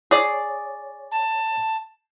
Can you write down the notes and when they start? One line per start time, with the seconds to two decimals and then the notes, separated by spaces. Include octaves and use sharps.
0.11 G#4 C#5 D5
1.12 A5